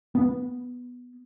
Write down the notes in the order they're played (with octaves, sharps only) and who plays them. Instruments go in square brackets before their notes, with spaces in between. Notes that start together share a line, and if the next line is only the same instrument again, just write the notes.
[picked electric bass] B3